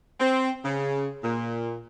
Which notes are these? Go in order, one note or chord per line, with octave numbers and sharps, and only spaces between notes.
C4
C#3
A#2